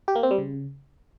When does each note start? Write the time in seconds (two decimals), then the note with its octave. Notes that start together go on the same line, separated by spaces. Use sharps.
0.08 G4
0.15 A#3
0.23 C4
0.31 G3
0.38 C#3